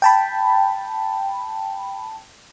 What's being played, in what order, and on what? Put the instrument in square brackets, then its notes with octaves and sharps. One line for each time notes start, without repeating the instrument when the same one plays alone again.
[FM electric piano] G5 A5 B5